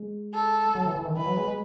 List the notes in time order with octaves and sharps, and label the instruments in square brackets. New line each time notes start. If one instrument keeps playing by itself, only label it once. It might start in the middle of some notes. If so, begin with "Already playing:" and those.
Already playing: [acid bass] G#3
[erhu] A4
[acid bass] F#3
E3
E3
D#3
[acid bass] E3 [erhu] B4
[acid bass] F#3
G#3
G#3